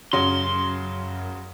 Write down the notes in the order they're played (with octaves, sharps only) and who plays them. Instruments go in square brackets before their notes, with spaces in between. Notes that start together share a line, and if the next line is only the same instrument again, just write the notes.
[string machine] F#2 [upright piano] C#3 F#3 [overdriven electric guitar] C6